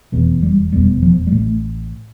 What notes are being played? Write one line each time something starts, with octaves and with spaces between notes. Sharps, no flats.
F1 E2 B2
G3
F1 E2 B2 G3
F3
G3
A1 A2 A3